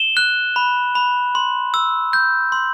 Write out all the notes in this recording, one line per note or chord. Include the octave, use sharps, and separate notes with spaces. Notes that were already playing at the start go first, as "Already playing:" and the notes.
Already playing: E7 G7
F#6
B5
B5
C6
E6
G6
C6